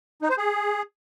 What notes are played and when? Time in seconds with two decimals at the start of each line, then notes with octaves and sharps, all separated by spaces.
0.22 D#4
0.30 C5
0.37 G#4